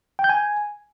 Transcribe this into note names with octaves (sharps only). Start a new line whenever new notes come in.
G5
G6
G#5